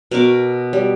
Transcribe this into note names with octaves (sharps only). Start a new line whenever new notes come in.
B2 A#4 C#6 D6
G3